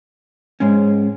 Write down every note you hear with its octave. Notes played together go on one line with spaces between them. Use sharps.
G#2 G#3 C#4